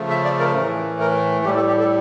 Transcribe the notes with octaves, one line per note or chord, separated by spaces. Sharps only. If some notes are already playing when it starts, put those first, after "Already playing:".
Already playing: C#3 F3 A3
E5
D5
A#4
A2 E3 A3 A#4
A#4
A2 G3 G4
A4
G4
A4